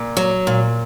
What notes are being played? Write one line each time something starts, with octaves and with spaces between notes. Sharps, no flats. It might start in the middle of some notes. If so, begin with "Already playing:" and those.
Already playing: A#2
F#3
A#2